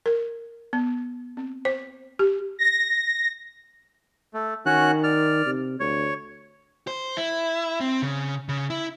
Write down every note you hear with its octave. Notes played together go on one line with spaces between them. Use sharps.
A#4
B3
C4
C5
G4
A#6
A3
D#3 C#4 F#4 F#6
D5 F6
C3
D2 C#5
C5
E4
C4
C#3
C#3
E4